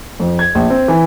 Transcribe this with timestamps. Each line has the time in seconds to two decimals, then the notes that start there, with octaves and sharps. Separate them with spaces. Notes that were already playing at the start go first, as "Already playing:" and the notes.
0.20 F2
0.39 G#6
0.55 A#1
0.70 C4
0.88 E3